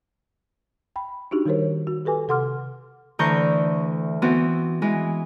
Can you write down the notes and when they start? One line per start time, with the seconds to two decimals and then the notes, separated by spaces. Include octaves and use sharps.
0.96 G5 B5
1.31 D4 D#4 F#4 G4
1.45 D#3 G3 G4 A#4 C5 C#5
1.87 F#4
2.05 G4 A4 B4 G#5 D6
2.28 C3 A4 F#5 C6 D6 F6
3.19 D2 D3 E3 A#5 C#6 G6
4.22 E3 B3 C4 F#4
4.82 E3 G#3